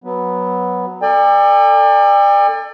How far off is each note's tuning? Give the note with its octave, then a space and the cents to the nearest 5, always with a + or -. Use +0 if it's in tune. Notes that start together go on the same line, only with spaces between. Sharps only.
F#3 +0 B3 +0
A4 +25 D5 +25 G5 +45